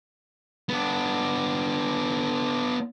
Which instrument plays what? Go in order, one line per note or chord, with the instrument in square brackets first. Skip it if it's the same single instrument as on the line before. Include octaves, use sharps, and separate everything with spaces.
[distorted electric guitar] B3 D4